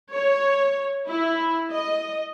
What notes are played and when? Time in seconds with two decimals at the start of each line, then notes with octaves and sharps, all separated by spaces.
0.13 C#5
1.09 E4
1.71 D#5